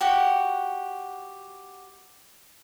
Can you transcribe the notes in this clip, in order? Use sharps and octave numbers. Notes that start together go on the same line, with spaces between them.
F#4 G4 F#5